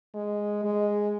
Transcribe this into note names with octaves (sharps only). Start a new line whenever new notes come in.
G#3
G#3